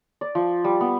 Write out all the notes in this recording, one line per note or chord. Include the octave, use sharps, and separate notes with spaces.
D5
F3
G3
B3